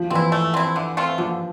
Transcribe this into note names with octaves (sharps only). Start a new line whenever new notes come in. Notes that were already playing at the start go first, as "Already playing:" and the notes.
Already playing: F3
E3 C4 E4
A3
C4 E4
D3
A3 C4 F4
D3 F3